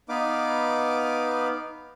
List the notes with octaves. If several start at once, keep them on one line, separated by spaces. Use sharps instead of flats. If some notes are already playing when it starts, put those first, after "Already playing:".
B3 D#4 B4 F5 D6